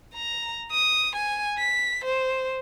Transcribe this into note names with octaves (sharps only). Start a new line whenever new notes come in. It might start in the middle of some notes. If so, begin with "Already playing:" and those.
A#5
D#6
G#5
B6
C5